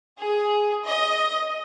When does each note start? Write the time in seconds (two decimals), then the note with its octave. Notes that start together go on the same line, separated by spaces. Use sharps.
0.19 G#4
0.86 D#5